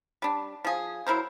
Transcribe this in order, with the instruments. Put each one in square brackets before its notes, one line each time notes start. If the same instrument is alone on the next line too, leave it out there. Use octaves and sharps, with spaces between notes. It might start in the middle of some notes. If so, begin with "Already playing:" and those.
[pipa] G3 D4
F3 G#4
F#3 E4 A#4 C5